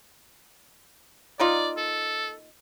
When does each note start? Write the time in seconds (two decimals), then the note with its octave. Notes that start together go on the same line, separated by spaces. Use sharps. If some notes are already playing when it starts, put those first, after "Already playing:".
1.40 A#3 D#4 F4 D5
1.77 A4